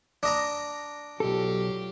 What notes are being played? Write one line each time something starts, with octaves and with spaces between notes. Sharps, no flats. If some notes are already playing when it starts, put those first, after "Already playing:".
D4 D#5 A#5
B1 F#3 F4 G4 A4